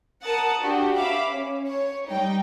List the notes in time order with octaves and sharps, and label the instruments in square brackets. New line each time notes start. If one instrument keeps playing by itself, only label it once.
[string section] A#4 F#5 A5 D#6
D4 F#4 G4
E5 F5 B5 D6
C#4
C#5
G3 D#4 G5